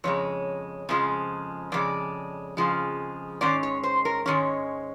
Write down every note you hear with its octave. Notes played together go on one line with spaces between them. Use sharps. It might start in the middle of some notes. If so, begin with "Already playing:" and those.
F2 C#3 G#3 C#5
F2 C#3 F3 G#3
F2 C#3 G#3 D5
F2 C#3 F3 G#3
G#2 D#3 G#3 C#4 D5
C#5
C5
A#4
G#2 D#3 G#3 C#4 C#5